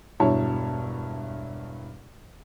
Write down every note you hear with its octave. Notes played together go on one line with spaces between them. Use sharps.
E1 G2 E4 C#5 A5